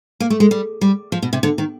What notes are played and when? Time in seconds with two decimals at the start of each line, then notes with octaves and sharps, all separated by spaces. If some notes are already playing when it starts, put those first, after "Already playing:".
0.20 A#3
0.30 A3
0.40 G#3
0.51 G3
0.81 G3
1.12 F3
1.22 B2
1.33 C3
1.43 D3
1.58 D#3